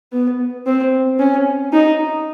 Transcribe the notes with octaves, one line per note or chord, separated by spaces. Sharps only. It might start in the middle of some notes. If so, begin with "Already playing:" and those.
B3
C4
C#4
D#4